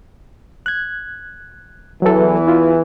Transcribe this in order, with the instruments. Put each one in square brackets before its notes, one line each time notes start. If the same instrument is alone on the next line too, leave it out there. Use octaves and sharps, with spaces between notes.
[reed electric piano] F#6 G#6
[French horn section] E2 E3 [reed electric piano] F#3 A4
[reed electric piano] E4 F4